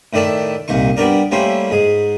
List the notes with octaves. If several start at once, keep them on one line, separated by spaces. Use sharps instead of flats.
A2 D#3 D5 E5 A5
C2 A#2 D#4 C#6
G3 B3 D4 A#4 D5
G3 A3 A#3 C#4 E4 C5
G#2 G#4